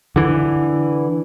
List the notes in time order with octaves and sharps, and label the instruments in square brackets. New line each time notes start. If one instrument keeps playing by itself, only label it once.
[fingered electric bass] D3 E3